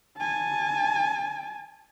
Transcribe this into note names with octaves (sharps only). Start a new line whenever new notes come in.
G#5 A5